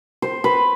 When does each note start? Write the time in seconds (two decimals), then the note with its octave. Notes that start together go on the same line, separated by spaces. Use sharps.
0.22 C5
0.44 B4